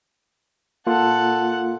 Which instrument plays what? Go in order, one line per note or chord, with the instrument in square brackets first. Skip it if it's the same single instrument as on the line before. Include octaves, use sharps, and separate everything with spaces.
[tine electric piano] A#3 F4 [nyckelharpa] A4 F#5